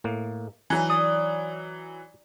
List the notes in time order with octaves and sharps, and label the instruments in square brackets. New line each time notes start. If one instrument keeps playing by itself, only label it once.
[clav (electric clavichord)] A2 A#3
[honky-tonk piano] E3 F#3 [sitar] D#4 [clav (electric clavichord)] G#5
[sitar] D5 [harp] D#6